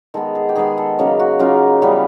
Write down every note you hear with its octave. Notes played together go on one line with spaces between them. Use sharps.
D#3 G#3 B3 A4
G#4
G4
D#3 G#3 B3 G#4
A4
C#3 F#3 A#3 D#4
F#4
C#3 F#3 A#3 D#4 F4
C#3 E3 G3 B3